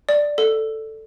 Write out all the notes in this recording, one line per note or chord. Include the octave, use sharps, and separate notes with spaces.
D5
A4